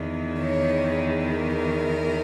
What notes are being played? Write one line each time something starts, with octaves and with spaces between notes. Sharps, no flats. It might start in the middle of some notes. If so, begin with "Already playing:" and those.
Already playing: E2 D#3
C#5
A#4